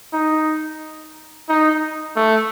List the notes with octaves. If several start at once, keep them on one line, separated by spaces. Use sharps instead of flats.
D#4
D#4
A3